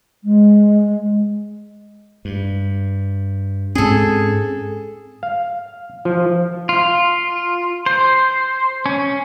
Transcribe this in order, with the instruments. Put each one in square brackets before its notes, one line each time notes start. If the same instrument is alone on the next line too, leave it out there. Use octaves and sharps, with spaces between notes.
[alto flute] G#3
[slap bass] G2
[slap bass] G#2 C4 C#4 [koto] G#4 A4
[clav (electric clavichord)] F5
F3
[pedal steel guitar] F4
C5
C#4